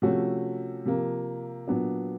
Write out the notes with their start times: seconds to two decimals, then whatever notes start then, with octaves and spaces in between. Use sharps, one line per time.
0.02 C3 F3 A3 C#4 F#4
0.85 C3 F3 A#3
1.68 A#2 F#3 B3 D4